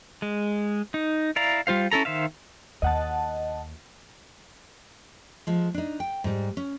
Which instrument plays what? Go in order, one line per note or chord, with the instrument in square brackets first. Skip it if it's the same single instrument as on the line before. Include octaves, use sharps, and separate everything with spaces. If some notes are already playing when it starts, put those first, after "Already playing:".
[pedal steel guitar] G#3
D#4
E4 D5 F5 A#5
G3 F4 C5 F5
C#4 E4 A4 A#5
D#3 C5 E5 F5
[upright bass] D#2 [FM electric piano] D#5 F#5 A5
[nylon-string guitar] F3 G#3
D4 D#4
G5
G#2 G3
C#4